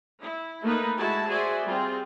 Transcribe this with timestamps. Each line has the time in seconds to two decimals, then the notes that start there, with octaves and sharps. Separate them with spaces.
0.19 E4
0.62 A3 A#3 D#4 B4
0.98 G#3 E4 F#4 A5
1.28 F#4 G#4 C5 D5 E5 G#5
1.66 G3 C4 F4 G#4